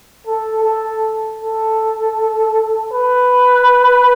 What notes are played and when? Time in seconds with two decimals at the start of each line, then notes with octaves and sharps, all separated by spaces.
0.27 A4
0.64 A4
1.42 A4
2.93 B4